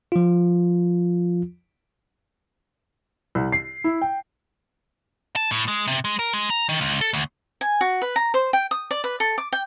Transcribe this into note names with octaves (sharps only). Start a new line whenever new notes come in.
F3 F4
C2
C7
E4
G5
A5
A2
G#3
C3
G#3
A#4
G#3
A#5
D#3
C#2
A4
D2
G#5
F#4
B4
A#5
C5
G5
D#6
D5
B4
A4
D6
G5